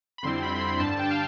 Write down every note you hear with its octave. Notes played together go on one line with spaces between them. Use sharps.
B5
F2 D3 G3 C4 E4 C6
B5
C6
B5
G2 D3 G3 D4 A5
G5
F5